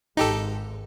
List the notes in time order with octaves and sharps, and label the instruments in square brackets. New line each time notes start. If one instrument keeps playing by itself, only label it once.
[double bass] G#1 G#2 [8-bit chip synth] D#4 G4 A4